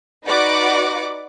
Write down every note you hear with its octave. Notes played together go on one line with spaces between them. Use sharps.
D#4 F#4 B4 D5 F#5 D6